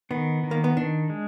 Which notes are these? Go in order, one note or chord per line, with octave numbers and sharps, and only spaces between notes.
D#3 B3
D#3
A#3
B3
D#3 D4
G#3